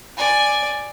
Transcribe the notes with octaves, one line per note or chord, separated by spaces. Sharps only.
D5 G#5